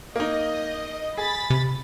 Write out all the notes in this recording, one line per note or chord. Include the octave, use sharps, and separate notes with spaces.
A#3 D#4 D#5
G#4 B5 A6 B6
C3